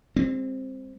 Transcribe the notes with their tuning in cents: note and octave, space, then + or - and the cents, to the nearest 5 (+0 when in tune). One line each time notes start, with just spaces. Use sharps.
G#3 -45 C4 +5